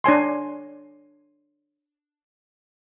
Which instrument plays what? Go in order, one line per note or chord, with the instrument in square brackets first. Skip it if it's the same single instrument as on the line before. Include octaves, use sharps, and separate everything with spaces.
[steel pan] D4 C#5 G#5 C6